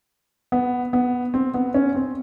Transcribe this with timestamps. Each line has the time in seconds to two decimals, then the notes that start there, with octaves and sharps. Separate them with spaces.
0.52 B3
0.93 B3
1.34 C4
1.54 B3
1.74 C#4
1.95 C4